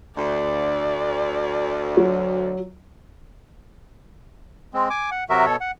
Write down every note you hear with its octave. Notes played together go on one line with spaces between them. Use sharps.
D2 D5
F#3
G#3 C4
G#5 D6
F#5
C3 F#3 F#4 A#4 E5
B2 A4 C#5
F#5